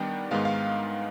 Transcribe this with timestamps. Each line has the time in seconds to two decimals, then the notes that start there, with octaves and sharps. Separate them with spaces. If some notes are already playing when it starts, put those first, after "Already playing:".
Already playing: D#3 G3 B3 D4 G5
0.31 G#2 D#3 G#3 B3 F5
0.45 F5